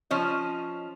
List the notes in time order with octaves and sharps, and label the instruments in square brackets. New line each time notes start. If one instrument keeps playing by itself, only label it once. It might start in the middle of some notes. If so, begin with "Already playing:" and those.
[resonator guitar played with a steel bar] F3 C#4 D#5